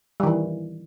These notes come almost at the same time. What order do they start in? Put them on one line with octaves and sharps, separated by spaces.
G3 D#3 E3